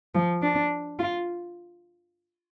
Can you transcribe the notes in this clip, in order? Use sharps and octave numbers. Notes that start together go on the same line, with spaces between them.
F3
D4
F4